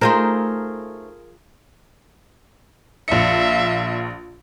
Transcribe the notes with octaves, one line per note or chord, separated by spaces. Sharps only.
A3 D#4 F4 G#4 A#4 C5
A#1 E5 F5 C#7